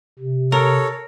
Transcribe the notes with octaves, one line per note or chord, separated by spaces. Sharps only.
C3
A4 A#4 C#5